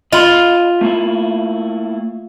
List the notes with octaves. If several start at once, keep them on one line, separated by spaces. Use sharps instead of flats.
F4 D#5 B5
A3 A#3 E4